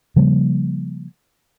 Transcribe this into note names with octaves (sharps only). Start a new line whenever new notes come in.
C#3 F3 G3 A#3